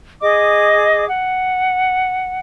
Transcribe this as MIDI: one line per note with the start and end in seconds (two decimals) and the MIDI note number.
0.21 1.07 68
0.21 1.07 75
0.21 1.07 86
1.07 2.39 78